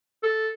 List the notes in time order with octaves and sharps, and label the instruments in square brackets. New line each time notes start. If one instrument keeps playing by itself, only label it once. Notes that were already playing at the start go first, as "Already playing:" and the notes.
[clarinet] A4